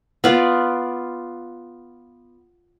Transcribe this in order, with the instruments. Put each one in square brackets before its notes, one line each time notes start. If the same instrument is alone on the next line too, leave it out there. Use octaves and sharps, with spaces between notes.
[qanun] B3 F4 D5